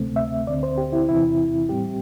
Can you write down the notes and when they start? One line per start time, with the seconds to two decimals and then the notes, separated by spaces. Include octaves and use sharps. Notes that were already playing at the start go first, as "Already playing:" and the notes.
Already playing: D2 C3 A3 C4
0.16 E5
0.47 D2 D3 C4 D5
0.63 C5
0.78 G4
0.93 E4
1.09 E2 C3 E3 C4 E4
1.69 A2 G3 C4 G4